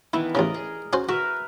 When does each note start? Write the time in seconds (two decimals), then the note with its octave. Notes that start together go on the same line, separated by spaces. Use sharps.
0.14 D#3 E3 B3 E4
0.35 A1 C#3 A#4 D5 D#5
0.54 G#4
0.93 C#4 F#4 C5
1.09 F#4 A#4 B4 E5